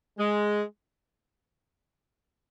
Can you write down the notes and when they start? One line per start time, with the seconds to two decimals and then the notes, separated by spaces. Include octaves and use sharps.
0.18 G#3